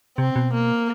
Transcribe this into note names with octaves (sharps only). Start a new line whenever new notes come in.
C3 C4
B2
A#3